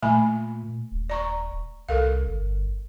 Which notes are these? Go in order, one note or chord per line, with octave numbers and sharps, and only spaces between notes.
A#2 A3 G#5 B5
D#1
D5 A#5 C#6
C2 A4 A#4 F5
G1